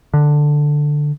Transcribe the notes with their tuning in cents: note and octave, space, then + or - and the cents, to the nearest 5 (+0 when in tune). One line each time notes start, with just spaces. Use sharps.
D3 +5